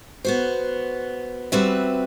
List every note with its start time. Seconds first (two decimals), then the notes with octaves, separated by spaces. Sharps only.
0.25 B3 F#4 C5
1.52 G3 C4 F#4 B4 E5